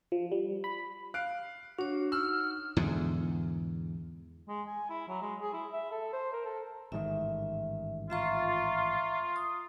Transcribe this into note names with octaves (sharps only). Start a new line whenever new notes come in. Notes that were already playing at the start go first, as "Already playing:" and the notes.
F3
G3
B5
F5 F#6 D7
D4 F#4 C#5
D#4 E6 F6
E2 G#2 D3
G#3
G#5
E4
F#3
G#3
G#4
E4
E5
A4
C5
A#4
A4
A1 G#2 D#3 E5
F4 E5 A#5 C#6
D#6